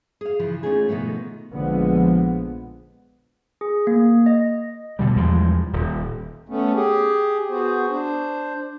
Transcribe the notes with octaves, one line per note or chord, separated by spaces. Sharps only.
G#4 F5
C#3 E3 F3
A3 C#4 D#4 F4 G#4
B2 D#3 F3 A3 B3
A#1 D3 F3 G#3 B3
G#4
A#3
D#5
B2 D3 G3
E2 F3 G3 G#3
D#1
A3 B3 C#4
G4 G#4
B3 F#4 G#4 C5
D4 C5